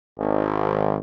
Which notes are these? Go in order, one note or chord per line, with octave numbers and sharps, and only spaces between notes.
G#1